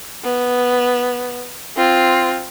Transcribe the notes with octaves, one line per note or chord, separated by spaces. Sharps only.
B3
C4 F4